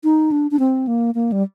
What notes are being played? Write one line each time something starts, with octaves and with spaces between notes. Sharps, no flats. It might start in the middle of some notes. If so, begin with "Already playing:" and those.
D#4
D4
D4
C4
A#3
A#3
G3